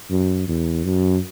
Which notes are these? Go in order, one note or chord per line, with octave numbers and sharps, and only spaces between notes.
F#2
E2
F#2